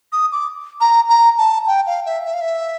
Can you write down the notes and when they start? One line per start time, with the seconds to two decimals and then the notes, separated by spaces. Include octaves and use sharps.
0.12 D#6
0.32 D6
0.80 A#5
1.09 A#5
1.38 A5
1.67 G5
1.87 F5
2.06 E5
2.25 E5
2.33 F5
2.41 E5